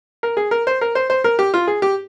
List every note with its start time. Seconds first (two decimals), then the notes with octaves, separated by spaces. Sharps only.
0.23 A#4
0.37 G#4
0.51 A#4
0.67 C5
0.81 A#4
0.95 C5
1.10 C5
1.24 A#4
1.39 G4
1.54 F4
1.67 G#4
1.82 G4